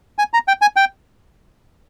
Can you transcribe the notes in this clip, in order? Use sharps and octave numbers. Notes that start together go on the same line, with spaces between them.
G#5
A#5
G5
G#5
G5